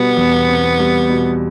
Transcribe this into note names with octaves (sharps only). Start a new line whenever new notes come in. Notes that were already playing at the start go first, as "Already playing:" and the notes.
Already playing: B2 G3 B3
E2
C4
G3
B2